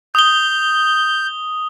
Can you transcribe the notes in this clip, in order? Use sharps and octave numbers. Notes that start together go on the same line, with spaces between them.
D#6 G6 G7